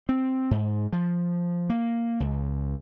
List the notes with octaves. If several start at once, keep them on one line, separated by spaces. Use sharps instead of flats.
C4
G#2
F3
A#3
C#2